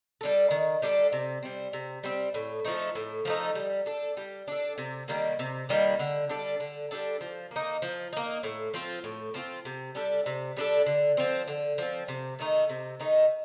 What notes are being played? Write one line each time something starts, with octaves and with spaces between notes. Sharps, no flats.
G3 D4 A4
D#3
G3 D4 A4
C3
G3 C4
C3
G3 C4
A2
F3 A3 D#4
A2
F3 A3 D#4
G3
D4 A4
G3
D4 A4
C3
D#3 G3 A#3
C3
D#3 G3 A#3
D3
G3 D4 A4
D3
G3 D4 A4
F3
A#3 D#4
F3
A#3 D#4
A2
F3 C4 F4
A2
F3 C4 F4
C3
G3 D4 A4
C3
G3 D4 A4
D3
F3 C4
D3
F3 C4
C3
D#3 A3 D#4
C3
D#3 A3 D#4